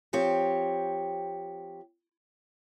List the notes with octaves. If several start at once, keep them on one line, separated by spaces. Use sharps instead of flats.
F3 C4 G4 C#5